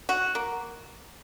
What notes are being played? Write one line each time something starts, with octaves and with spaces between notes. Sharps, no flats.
F#4
A#3